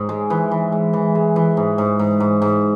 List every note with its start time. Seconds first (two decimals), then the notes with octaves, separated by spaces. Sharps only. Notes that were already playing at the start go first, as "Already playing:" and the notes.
Already playing: G#2
0.09 G#3
0.30 E3
0.51 E3
0.72 G#3
0.93 E3
1.15 G#3
1.36 E3
1.57 G#2
1.78 G#2
1.99 G#2
2.20 G#2
2.42 G#2